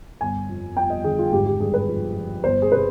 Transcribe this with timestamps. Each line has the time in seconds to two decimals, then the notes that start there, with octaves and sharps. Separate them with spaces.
0.21 G1 G#5
0.49 F2
0.76 F2 G5
0.90 D#5
1.04 D3 G#4
1.19 F4
1.32 G#1 G4
1.46 G4
1.60 G2 G#4
1.74 B4
1.88 F3
2.16 F3
2.44 G1 C5
2.62 G#4
2.72 C3 B4